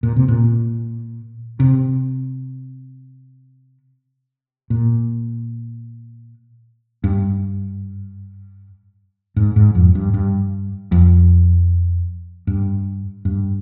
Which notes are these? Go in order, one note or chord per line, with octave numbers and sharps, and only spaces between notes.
A#2
C3
A#2
C3
A#2
G2
G#2
G#2
F2
G2
G2
F2
G2
G2